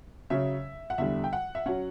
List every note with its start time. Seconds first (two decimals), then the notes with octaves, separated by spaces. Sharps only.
0.30 C#3 F#3 C#4 E5
0.90 F#5
0.98 E2 D3 G3 E5
1.24 G5
1.33 F#5
1.55 E5
1.66 F#3 C#4 F#5